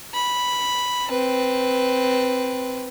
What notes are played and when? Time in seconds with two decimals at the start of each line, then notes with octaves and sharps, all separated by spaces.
0.14 B5
1.08 C4 B4